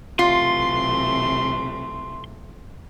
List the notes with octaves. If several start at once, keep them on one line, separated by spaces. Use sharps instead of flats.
B1 C3 E3 A3 F4 C6